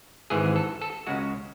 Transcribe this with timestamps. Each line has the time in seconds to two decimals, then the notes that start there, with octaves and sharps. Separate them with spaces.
0.30 G#1 G#2 E3 G#4
0.56 A4
0.82 A4
1.07 C#2 C#3 G#3 F#4